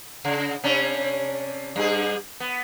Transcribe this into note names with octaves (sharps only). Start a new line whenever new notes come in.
C#3
C3 C#4 D4
G2 G#4
B3